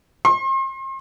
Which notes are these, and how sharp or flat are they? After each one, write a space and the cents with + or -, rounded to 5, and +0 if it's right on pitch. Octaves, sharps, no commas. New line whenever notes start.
C6 +40